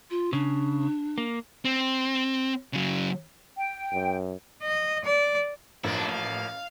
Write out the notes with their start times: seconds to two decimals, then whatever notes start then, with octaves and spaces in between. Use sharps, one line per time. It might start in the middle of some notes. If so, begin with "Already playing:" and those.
0.10 F4
0.33 C#3 D4
1.18 A#3
1.65 C4
2.73 C#3 F#3
3.57 G5
3.93 F#2
4.62 D#5
5.04 D5
5.84 A1 F3 A#3 D4 E4
6.09 F5